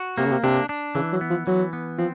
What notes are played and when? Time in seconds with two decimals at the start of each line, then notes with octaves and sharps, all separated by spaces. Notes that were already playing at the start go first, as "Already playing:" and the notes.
Already playing: F#4
0.18 C3 A#3
0.25 C#3
0.31 C3
0.43 C3 D4
0.69 D4
0.95 C#3 E3
1.13 F#3
1.21 B3
1.30 F3
1.47 E3 F#3
1.73 B3
1.98 F3 C4